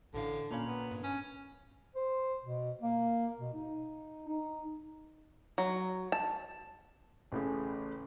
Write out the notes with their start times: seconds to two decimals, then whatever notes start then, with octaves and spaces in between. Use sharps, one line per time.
0.14 A1 A2 D3 F5
0.51 A#2 C#4 F5 A#5 B5
0.67 B3
0.91 G2
1.04 C#4
1.95 C5
2.44 B2
2.81 A#3
3.39 B2
3.54 D#4
4.28 D#4
5.58 F#3
6.12 A5
7.32 A1 A2 C#3